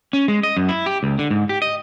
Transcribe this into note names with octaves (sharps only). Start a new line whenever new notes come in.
C#4
G#3
D#5
F#2
E4
G4
C#2
D3
G#2
G4
D#5